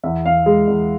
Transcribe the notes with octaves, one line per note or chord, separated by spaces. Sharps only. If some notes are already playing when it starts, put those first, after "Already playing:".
E2 E5
E2 F5
G#3
E2